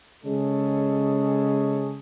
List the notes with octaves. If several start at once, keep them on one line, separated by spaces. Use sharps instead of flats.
C#3 G#3 C#4 G#4 A4